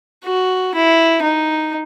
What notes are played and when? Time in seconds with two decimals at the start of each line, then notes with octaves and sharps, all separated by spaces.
0.24 F#4
0.75 E4
1.23 D#4